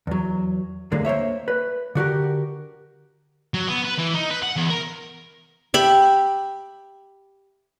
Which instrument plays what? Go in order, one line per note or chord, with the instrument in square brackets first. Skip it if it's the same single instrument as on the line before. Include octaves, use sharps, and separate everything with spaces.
[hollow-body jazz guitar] E2 F#3
D#2 A2 D3 G#3 A#3
A#3 C5 C#5 E5
B4
D3 F#4 G4 A#4
[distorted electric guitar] F#3
B3
B4
E3
D#4
B4
F#5
E2
A#4
[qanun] G4 E5 B5